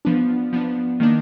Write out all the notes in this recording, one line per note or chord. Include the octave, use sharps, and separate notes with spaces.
F3 B3 D4
F3 B3 D4
D#3 A#3 D4